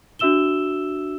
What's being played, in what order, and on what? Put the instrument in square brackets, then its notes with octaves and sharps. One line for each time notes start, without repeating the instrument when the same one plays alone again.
[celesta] D4 F#4 E5 E6 E7 G7